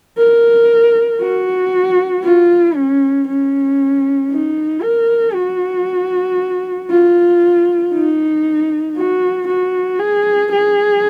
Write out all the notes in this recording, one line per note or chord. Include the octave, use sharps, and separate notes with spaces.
A#4
F#4
F4
C#4
C#4
D#4
A#4
F#4
F4
D#4
F#4
F#4
G#4
G#4